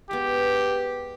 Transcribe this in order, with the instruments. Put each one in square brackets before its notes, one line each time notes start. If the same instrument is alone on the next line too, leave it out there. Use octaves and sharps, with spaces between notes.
[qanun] G#3 B3 [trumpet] G4